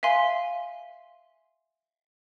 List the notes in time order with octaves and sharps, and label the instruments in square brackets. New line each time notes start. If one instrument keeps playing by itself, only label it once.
[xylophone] E5 F5 G#5 C6